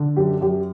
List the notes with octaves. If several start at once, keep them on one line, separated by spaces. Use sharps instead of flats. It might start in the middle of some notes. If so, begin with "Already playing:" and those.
Already playing: D3
F#2 G4
F#2 G4